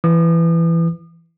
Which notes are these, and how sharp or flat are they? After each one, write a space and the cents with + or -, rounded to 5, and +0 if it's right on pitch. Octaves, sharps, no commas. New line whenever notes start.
E3 +15 D#6 -45